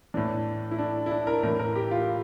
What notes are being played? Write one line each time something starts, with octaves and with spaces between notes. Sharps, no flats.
A2 E3 D4
E4
D4
E4
D4
A#4
A2 E3 A#4
A#4
G4
F4